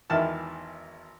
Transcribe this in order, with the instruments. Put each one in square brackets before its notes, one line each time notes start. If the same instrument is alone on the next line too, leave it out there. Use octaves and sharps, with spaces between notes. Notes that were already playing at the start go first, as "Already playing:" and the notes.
[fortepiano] G#1 E2 D#3 E4 A5 F6